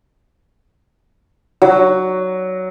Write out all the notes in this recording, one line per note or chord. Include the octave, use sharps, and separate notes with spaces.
F#3